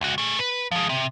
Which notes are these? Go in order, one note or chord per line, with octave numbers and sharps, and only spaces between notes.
C#2 F#4
A3 G#4
B4
F3 G#3
C3